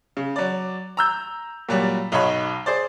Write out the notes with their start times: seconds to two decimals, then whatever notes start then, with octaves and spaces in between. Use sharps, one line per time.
0.17 C#3
0.36 F#3 D5
0.97 A#5 E6 G6
1.69 A#2 F#3 G3
2.12 B1 D#4 F#4 C#5 B5
2.66 G#4 C5 D5